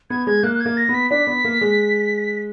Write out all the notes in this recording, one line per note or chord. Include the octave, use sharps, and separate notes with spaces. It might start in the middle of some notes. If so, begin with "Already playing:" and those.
B3 G#6
G#3 G#6
A#3 F#6
F#6
G#6
A#3
A#6
B3
B6
D4 B6
B3
A#3
G#3